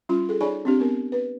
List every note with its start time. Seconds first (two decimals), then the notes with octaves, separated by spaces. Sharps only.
0.09 G3 C#4 F4 C6
0.29 G#4 A4
0.41 D#4 G#4 C#5 D5 G#5 B5
0.65 C4 D4 G4
0.80 B3 A#4
1.12 B4